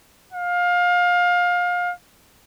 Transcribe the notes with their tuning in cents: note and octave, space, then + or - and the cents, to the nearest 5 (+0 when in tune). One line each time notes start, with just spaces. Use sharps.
F5 +25